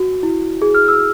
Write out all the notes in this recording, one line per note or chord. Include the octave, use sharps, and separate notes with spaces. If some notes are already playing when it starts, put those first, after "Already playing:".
Already playing: F#4
E4
G#4
F6
E6